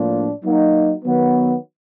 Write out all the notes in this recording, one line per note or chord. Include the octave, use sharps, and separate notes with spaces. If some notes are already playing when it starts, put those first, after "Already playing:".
Already playing: A2 F3 A#3 D4 F4
F#3 A#3 D#4 F#4
D#3 F#3 B3